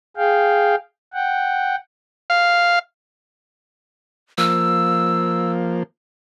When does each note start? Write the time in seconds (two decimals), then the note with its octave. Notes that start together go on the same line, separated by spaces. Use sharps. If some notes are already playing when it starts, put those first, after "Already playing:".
0.17 G#4 F5 G5
1.14 F#5 G5
2.30 F5
4.38 F3 A#3 E6